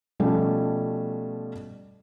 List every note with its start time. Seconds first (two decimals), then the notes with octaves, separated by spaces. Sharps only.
0.20 B2 F3 G3 A3 C#4